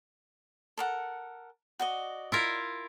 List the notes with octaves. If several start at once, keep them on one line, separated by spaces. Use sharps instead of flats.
A4 A#4 F#5
F#4 D5 D#5
E4 F4 A#4